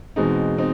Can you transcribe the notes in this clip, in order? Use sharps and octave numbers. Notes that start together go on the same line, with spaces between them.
E2 B2 G#3 C4 D#4
C4 D#4